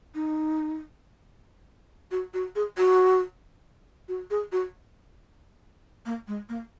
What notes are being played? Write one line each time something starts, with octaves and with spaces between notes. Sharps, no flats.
D#4
F#4
F#4
G#4
F#4
F#4
G#4
F#4
A#3
G#3
A#3